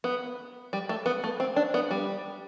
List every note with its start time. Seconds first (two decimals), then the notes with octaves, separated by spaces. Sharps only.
0.04 B3
0.73 G3
0.89 A3
1.06 B3
1.24 A3
1.40 C4
1.56 D4
1.74 B3
1.91 G3